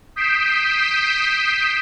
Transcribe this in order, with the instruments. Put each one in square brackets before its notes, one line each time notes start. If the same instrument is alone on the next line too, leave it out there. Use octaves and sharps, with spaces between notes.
[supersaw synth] D#6 G6 B6 C7 D7 E7